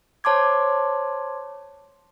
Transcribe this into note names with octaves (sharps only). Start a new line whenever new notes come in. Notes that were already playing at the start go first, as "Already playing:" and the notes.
C5 C#5 A5 C6 D6 G#6